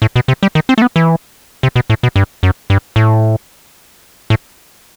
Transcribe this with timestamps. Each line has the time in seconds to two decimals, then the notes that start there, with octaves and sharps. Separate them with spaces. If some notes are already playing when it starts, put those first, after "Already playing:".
0.02 A2
0.16 B2
0.28 C3
0.43 G3
0.55 D#3
0.69 C4
0.78 A3
0.82 B3
0.96 E3
1.63 C3
1.76 B2
1.90 A2
2.03 B2
2.16 G2
2.43 F#2
2.70 G2
2.96 A2
4.30 A2